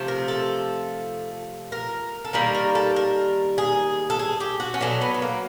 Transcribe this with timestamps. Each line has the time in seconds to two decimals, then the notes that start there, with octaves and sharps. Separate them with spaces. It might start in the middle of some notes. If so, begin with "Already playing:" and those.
Already playing: C3 F3 A3
0.08 A#4
0.28 A4
1.72 A#4
2.25 A4
2.33 D#3 G3 A#3 A#4
2.55 A#4
2.75 A4
2.96 A#4
3.58 G#4
4.10 A4
4.19 G#4
4.40 G4
4.60 F#4
4.74 C#4
4.81 B2 F#3 A3 D4
5.01 B3
5.14 B3
5.22 A#3